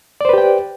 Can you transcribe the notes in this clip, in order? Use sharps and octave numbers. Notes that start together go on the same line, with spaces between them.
G4 B4 C5 D5 G5